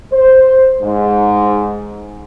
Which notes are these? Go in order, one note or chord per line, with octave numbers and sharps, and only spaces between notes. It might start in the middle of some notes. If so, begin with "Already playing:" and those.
C5
G#2